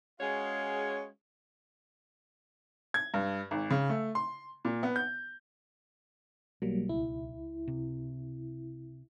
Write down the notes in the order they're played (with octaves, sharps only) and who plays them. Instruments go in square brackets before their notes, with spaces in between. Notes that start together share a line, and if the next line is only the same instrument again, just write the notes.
[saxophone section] G#3 C#4 F#4 G#4 C#5 F5
[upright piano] G#6
G2
G#1
C#3
A3
C6
A#2
B3
G6
[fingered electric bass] B1 [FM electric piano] F#3 G3 A#3
[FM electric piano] C#2 E4
[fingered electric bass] C3